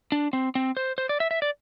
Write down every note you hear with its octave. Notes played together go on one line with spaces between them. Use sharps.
D4
C4
C4
C5
C5
D5
E5
E5
D5